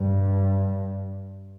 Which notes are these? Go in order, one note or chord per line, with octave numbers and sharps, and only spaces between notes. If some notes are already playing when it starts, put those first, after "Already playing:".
Already playing: G2